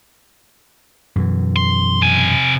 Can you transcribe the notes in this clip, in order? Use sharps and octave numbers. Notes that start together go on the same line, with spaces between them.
F#2 B2 E3
C6
C3 G#5